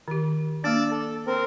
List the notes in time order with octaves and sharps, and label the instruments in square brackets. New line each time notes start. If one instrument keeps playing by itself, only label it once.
[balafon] D#3 G4
[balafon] A#3 D4 [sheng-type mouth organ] D5 D6 E6
[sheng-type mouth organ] A4
C4 A#4